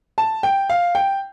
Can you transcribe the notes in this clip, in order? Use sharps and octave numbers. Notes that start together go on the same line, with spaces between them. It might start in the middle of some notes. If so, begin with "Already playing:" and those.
A5
G5
F5
G5